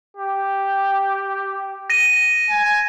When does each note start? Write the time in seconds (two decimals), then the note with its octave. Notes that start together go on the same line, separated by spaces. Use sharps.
0.17 G4
1.90 A#6 D#7
2.50 G#5